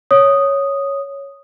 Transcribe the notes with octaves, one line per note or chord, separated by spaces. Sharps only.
C#5 D#6